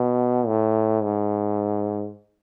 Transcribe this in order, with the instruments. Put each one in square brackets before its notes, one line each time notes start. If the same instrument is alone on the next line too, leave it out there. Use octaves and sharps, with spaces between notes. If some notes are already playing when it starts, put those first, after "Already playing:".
Already playing: [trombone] B2
A2
G#2